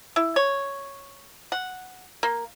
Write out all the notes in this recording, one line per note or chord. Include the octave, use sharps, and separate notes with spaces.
E4
C#5
F#5
A#3